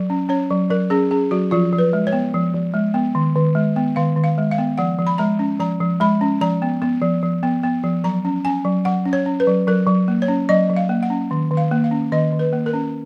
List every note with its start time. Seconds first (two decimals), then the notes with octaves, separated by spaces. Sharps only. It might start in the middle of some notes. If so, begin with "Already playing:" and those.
Already playing: F#3
0.10 C#4
0.29 C#4 C#5
0.50 F#3
0.70 F#3 A#4
0.90 C#4 G#4
1.11 C#4 G#4
1.31 F#3 F#4
1.51 F3 F4
1.73 F3
1.78 B4
1.93 G#3
2.07 C#5
2.12 B3
2.34 F3
2.54 F3
2.74 G#3
2.94 B3
3.15 D#3
3.36 D#3
3.55 G#3
3.76 B3
3.96 D#3 F5
4.16 D#3
4.24 F5
4.38 G#3
4.51 F5
4.58 B3
4.78 F3 F#5
4.99 F3
5.07 B5
5.18 G#3 A#5
5.39 C#4
5.59 F3 A#5
5.81 F3
6.00 G#3 B5
6.21 C#4
6.41 F3 A#5
6.62 B3
6.82 B3
7.02 F3
7.23 F3
7.43 B3
7.63 B3
7.83 F3
8.04 F#3 A#5
8.25 C#4
8.45 C#4 G#5
8.65 F#3
8.85 F#3 F#5
9.05 C#4
9.13 C#5
9.26 C#4
9.40 B4
9.47 F#3
9.67 F#3 A#4
9.87 F#3
10.08 A#3
10.22 C#5
10.28 C#4
10.49 F#3 D#5
10.70 F#3
10.76 F5
10.89 A#3
11.03 F#5
11.10 C#4
11.31 D#3
11.51 D#3
11.57 F5
11.71 A#3
11.84 F5
11.91 C#4
12.12 D#3 D#5
12.32 D#3
12.39 B4
12.52 A#3
12.66 A#4
12.73 C#4